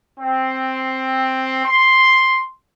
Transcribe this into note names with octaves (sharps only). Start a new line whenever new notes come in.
C4
C6